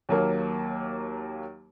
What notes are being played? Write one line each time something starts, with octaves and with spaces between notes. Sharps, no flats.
D#2 F#3 A#3